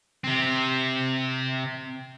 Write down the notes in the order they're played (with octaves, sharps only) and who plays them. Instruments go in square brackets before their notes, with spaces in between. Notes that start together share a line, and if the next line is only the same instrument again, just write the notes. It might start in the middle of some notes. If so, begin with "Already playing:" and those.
[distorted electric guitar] C3 C4